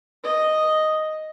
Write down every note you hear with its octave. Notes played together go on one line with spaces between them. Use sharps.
D#5